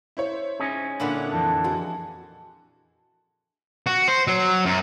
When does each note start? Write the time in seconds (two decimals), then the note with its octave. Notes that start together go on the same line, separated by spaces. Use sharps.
0.17 E4 C5 C#5
0.60 C#4 D#4 G#4
1.00 A#2 D3 D4 E4 F#5
1.33 F2 E3 A5
1.64 G#3 F#4
3.87 F#4
4.08 C5
4.27 F#3
4.65 F#2